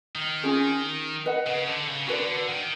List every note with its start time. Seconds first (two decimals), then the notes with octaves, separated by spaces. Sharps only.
0.15 D#3
0.43 C#4 F4 G#4
1.26 B4 D#5 F#5
1.46 C#3
1.67 D3
1.87 C#3
2.07 D3 F#4 B4 D5
2.49 D#3